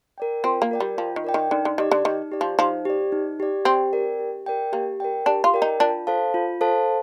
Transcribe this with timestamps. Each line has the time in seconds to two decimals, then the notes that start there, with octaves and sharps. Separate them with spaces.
0.18 A#4 D5 G5
0.44 C4 F4
0.62 A#3
0.71 A#4 D5 G5
0.80 G3
0.98 F3 F4
1.16 D#3
1.24 A#4 D5 G5
1.34 D#3
1.51 D3 D#4
1.65 D3
1.78 D#3 G4 D5
1.91 D3
2.05 D#3 D#4
2.32 G4 D5
2.41 F3
2.59 F3 D#4
2.85 G4 D5
3.12 D#4
3.40 G4 D5
3.65 C4 G4
3.93 A#4 D5 G5
4.19 G4
4.46 A#4 D5 G5
4.72 A#3 G4
5.00 A#4 D5 G5
5.26 D4 G4
5.44 F4
5.54 A#4 D5 G5
5.62 D#4
5.80 D4 F4
6.07 A4 C5 F5 A5
6.34 F4
6.61 A4 C5 F5 A5